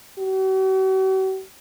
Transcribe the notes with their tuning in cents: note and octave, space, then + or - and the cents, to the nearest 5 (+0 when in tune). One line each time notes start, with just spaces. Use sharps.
F#4 +45